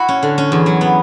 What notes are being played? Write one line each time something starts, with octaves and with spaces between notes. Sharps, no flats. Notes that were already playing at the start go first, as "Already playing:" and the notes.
Already playing: E4 F#4
C#4
D3
C#4
E2
F#3
B3